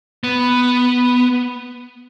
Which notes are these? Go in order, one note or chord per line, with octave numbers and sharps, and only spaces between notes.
B3